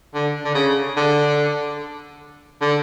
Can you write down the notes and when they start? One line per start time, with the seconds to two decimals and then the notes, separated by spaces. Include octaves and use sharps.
0.15 D3
0.45 D3
0.55 C#3
0.96 D3
2.61 D3